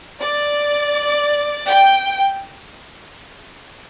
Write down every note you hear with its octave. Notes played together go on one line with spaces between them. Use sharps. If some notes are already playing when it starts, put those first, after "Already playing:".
D5
G5